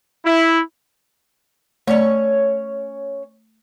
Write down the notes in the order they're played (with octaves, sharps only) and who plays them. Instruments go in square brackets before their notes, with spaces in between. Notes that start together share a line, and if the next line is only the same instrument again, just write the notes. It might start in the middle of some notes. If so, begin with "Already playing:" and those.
[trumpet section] E4
[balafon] A3 D5 [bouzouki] C#4 C#5